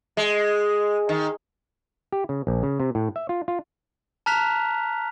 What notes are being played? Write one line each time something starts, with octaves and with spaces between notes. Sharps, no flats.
G#3
D#3
G4
C#3
A#1
C#3
C3
A2
E5
F4
F4
A5 A#5 F6 F#6 B6 F7